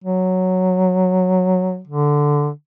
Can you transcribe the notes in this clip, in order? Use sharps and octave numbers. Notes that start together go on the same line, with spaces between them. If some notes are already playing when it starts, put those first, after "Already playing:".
F#3
D3